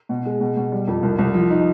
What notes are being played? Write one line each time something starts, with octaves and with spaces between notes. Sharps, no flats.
B2
G#3
B2
B2
G3
F2
C2
C2
F3
D#4